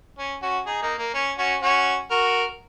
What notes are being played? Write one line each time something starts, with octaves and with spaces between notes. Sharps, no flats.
C#4
C#4 F#4
D#4 G#4
A#3 D#4
A#3
C#4
C#4 F#4
C#4 F#4
F#4 A#4